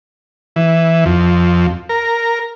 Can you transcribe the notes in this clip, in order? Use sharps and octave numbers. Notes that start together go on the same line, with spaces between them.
E3
F2
A#4